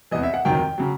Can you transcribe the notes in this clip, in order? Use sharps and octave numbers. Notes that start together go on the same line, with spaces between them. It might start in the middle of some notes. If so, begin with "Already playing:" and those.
E2 C3 E3 D#5
E5
F#5
F2 C3 D#3 F#3 G5
C#3 F#3